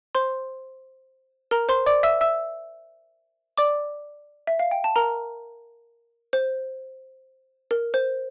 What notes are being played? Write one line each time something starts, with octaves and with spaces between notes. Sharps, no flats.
C5 C6
A#4 A#5
C5 C6
D5 D6
E5 E6
E5 E6
D5 D6
E5
F5
G5
A5
A#4 A#5
C5
A#4
C5